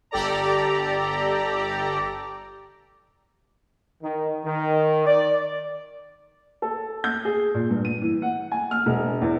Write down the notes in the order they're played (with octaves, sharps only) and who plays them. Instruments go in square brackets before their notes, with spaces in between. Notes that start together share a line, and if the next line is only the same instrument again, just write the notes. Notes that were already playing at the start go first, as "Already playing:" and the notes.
[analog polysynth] G1 G4 A4 D5 A#5
[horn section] D#3
D#3
D5
[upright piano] A4
G6
G#4
A#2
G2
D#7
E3
F#5
G#5
F6
E1
E2